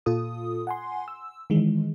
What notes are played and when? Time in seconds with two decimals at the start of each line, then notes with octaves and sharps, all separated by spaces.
0.06 A#2 F4 A4 D#6
0.67 F#5 G#5 C6
1.08 E6
1.50 D#3 E3 G#3